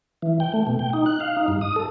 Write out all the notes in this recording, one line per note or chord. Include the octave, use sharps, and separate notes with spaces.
E3
G5
A3
B2
G5
D#4
F#6
F5
D#4
G2
D#6
A4